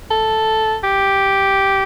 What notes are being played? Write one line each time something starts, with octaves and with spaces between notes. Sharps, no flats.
A4
G4